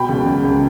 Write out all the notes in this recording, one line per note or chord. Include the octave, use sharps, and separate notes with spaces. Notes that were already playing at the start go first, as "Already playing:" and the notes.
Already playing: B2 G5 B5
C#2
C#2
C#2